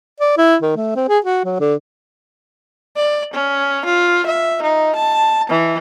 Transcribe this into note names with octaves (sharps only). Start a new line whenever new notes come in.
D5
E4
D#3
A3
C4
G#4
F#4
F#3
D3
D5
C#4
F4
E5
D#4
A5
E3